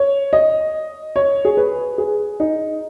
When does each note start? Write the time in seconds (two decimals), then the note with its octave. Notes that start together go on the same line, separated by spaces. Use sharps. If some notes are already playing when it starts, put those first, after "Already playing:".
Already playing: C#5
0.33 D#5
1.16 C#5
1.45 G#4
1.57 B4
1.98 G#4
2.40 D#4